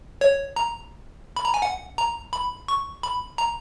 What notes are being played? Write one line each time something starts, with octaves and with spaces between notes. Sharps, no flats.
C#5
A#5
B5
A#5
G#5
F#5
A#5
B5
C#6
B5
A#5